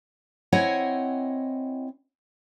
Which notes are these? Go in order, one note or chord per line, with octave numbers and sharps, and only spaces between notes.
C4 E4 C#5 D#5 F#5 G#5